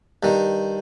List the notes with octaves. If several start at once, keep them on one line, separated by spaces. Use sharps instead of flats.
G2 D#3